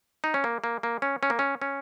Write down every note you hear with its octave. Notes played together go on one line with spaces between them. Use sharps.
D#4
C#4
A#3
A#3
A#3
C#4
C#4
A#3
C#4
C#4